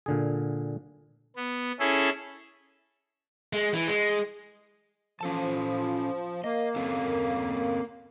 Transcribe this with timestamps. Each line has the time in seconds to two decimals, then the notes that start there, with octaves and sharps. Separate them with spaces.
0.06 A#2 D3 G#4
1.36 B3
1.80 C#4 E4 G#4 A4
3.53 G#3
3.74 E3
3.88 G#3
5.21 F3 C#4 A4 A5
6.44 A#3 D#5
6.76 C4 C#4 A4